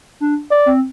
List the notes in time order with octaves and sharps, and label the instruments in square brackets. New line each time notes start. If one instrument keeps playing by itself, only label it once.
[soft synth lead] D4
[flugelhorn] D5
[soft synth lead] C4